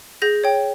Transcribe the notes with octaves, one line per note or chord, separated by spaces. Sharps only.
G#4 G6 A#6
C#5 G5